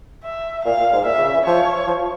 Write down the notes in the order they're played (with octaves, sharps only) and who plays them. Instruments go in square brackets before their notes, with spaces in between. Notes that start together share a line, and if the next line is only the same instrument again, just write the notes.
[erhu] E5
[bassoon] A#2 [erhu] F5
[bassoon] A#2
G#2
[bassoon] A#2 [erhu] E5
[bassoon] C#3
E3
[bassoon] F3 [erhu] C#5
[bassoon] F3